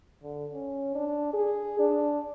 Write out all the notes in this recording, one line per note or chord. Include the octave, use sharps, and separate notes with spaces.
D3
C#4
D4
G#4
D4